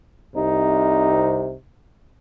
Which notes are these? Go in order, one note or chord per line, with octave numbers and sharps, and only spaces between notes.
C2 C3 D#4